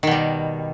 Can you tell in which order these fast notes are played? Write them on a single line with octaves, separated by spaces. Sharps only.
D#3 B2 G3